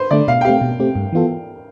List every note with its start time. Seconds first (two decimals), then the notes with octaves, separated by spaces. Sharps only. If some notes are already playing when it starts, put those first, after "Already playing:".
Already playing: B4 C5
0.11 D3 A3 D4 D5
0.28 B2 F5
0.41 G5
0.45 A3 C4 G4 F5
0.61 B2
0.79 A3 C4 G4
0.95 G2
1.13 E3 B3 F4 A4